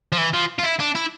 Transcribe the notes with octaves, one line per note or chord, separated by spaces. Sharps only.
F3
E3
F3
F4
E4
D4
E4